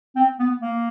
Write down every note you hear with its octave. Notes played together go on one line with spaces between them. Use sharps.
C4
B3
A#3